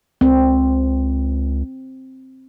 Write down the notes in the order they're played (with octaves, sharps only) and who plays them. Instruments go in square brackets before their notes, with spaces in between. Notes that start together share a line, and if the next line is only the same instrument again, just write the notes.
[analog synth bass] C#2 [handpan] C4